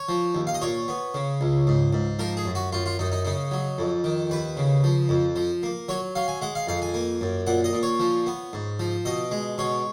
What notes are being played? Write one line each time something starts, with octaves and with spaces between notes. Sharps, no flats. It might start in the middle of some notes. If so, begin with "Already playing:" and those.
Already playing: C#5
F3
D#2
F5
D#5
A#2 C#5
B3
C#3
C#2
G#2
G#2
F3 A#4
G#4
F#2
F#4
F#2 F4
F4
F#2 D#4
D#4
C#3 D#4
F#3
F2
D#3
D#2 B4
C#3
F3
F2
F3
A#3
F#3 C#5
F#3 F5
G#5
G#3 F#5
F5
F2 F5
G#5
A#3
F#2
A#2 F#5
D#5
A#2
C#5
F3
B3
G#2
F3
B2 D#5
G#3
B2 C#5